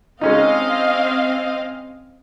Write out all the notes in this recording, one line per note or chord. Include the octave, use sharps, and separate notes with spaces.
G#3 C4 C#4 D#4 D#5 F5